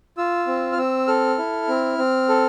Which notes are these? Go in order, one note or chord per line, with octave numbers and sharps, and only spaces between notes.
F4 E6
C4
F6
C4 E6
A4 F6
E4
C4
C4
A4